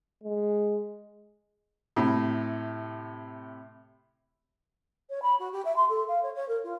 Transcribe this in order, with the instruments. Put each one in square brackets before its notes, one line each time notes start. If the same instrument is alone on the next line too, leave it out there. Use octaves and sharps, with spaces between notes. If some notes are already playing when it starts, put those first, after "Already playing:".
[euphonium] G#3
[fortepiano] A2 C3
[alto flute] C#5
B5
F#4
G4
E5
C6
A4
F5
C#5
C#5
A#4
F4